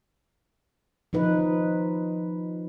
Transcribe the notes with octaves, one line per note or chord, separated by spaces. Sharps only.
F3 D#4 B4